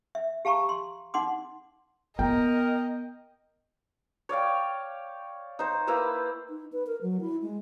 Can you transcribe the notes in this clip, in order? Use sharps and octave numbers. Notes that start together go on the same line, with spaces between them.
E5
G4 F5 A5 A#5 C#6
C6
D#4 F#5 C6 D6
B3 A#4 D#5 G5
C#5 D5 F5 G5
D#4 C5
A#3 E4 B4 C5
D#4
B4
A#4
F#3
E4
G#3